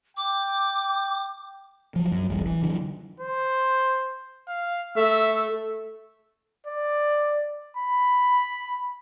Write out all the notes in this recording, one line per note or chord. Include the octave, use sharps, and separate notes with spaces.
G5 D6
F3 F#3
F#2
D1 A1 G3
E3
D3 E3 F#3
C5
F5
A3 E5
D5
B5